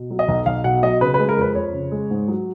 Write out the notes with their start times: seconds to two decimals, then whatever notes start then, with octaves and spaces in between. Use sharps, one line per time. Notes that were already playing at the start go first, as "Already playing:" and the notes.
Already playing: B2
0.10 F#3
0.19 D#5
0.28 B1
0.46 B1 F5
0.64 B2 F#5
0.83 F#3 D#5
1.01 C#3 B4
1.14 B4
1.19 G#3
1.29 A#4
1.37 F2 B4
1.55 F2 C#5
1.73 C#3
1.91 G#3
2.10 G#2
2.28 F#3